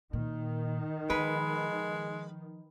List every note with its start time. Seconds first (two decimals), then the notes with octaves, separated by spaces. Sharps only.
0.13 A#2 D#3
1.10 F3 G#3 B4